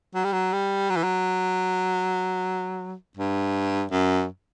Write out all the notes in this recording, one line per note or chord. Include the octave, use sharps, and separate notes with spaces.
F#3
G3
F#3
G3
F#3
E3
F#3
G2
F#2